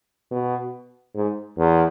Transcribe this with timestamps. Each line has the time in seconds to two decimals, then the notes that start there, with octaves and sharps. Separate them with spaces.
0.31 B2
1.15 G#2
1.58 E2